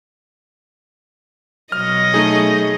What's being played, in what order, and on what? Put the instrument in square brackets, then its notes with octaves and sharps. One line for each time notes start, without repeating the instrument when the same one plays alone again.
[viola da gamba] B2 F#3 D#5 [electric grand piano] F6
[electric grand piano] A3 D#4 G#4